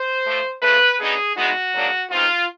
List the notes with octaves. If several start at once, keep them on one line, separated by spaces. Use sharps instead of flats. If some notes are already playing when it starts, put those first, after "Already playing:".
Already playing: C5
A2 F3 A3
C#3 F3 A3 B4
D3 F#3 B3 D#4 G#4
E2 B2 G#3 B3 D#4 F#4
G#2 D#3 F#3 A#3 D4
B2 G#3 C4 D#4 F4